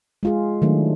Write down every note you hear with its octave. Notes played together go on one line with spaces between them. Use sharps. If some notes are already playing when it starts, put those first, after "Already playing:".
G#3 F4 G#4
D#3 F#3 A3 D4